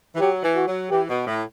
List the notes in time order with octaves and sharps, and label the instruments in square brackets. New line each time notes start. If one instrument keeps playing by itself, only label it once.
[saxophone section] E3
[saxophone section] F#3 [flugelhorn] G4
[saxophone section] E3
[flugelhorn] F#4
[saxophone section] F#3
[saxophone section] E3 [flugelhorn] G4
[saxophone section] B2
A2